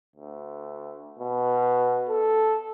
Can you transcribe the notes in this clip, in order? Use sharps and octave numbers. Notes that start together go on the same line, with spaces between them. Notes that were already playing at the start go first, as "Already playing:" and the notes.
D2
B2
A4